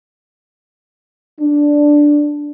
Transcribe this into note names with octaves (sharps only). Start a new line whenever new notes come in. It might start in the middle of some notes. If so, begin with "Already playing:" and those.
D4